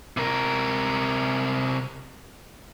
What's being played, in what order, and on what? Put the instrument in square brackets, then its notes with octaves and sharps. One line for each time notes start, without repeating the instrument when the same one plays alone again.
[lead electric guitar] C3 A#4